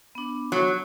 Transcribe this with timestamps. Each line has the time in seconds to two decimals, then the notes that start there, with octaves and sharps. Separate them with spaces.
0.15 B3 D4
0.52 F#3